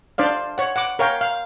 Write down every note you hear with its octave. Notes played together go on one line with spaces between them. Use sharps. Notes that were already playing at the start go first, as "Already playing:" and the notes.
D4 C5 D5 F5
C#5 F#5
F#5 D6
A#4 C#5 F5 G5
F5